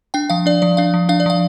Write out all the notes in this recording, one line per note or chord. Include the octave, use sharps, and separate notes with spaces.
D4 G5
F3 F5
D4 D5
F3 D5
D4 F5
F3
D4 F5
D5
F3 F5